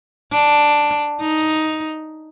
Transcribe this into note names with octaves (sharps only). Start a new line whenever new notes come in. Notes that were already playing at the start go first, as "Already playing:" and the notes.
D4
D#4